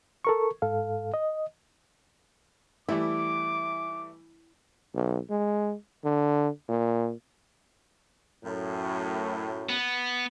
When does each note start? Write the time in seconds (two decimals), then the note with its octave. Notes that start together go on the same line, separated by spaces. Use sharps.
0.25 A4 A#4 C#6
0.62 G#2 A4 F5
1.14 D#5
2.89 E3 G3 A3 E4 D6
4.95 B1
5.30 G#3
6.04 D3
6.69 A#2
8.44 F#2 A2
9.69 B3